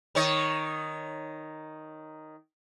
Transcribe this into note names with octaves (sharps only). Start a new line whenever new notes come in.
D#3 C#5 D#5